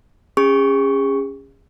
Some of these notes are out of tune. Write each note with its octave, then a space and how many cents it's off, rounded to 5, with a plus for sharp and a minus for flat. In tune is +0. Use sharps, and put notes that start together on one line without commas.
C#4 +0 G#4 -35 C#6 +0